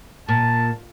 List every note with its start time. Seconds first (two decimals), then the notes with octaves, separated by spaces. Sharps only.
0.29 A#2 A5